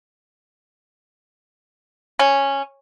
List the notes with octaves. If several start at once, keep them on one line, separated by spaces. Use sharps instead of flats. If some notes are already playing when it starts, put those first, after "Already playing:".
C#4